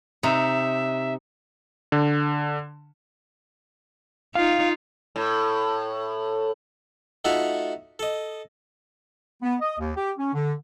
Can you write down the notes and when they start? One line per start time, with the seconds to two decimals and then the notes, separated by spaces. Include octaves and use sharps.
0.23 C3 D#4 E5
1.92 D3
4.35 D#4 F4 F5
5.16 A2
7.25 A3 D#4 F4 F#4 E5 F#5
7.99 A4 D#5
9.43 B3
9.61 D#5
9.79 D#2
9.96 G4
10.18 C#4
10.34 D3